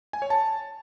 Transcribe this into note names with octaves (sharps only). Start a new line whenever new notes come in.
G#5
C#5
A5